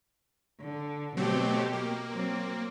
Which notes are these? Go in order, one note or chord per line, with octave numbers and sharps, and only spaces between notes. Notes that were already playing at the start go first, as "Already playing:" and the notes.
D3
B2 F#3 A3 C4 G4
A#3
F#3 C4